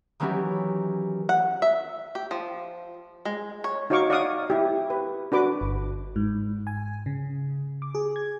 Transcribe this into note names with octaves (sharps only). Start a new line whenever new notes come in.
D#3 E3 F#3 C#4 E4 G4
F#5
E5
G4
F3
G#3
C#5
D#4 F#4 C#5 F5 C#6 D6
D5 F5 F#5 C#6 D#6
E4 G4
B4
D4 F#4 B4 D6
G1
G#2
G#5
C#3
D6
G#4
G#6